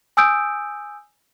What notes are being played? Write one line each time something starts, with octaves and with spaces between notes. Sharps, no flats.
G#5 D#6 E6 G6 D7